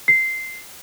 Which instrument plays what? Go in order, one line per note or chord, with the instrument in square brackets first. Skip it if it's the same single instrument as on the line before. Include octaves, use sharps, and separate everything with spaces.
[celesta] C7